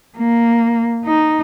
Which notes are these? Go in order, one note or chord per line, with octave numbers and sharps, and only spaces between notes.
A#3
D#4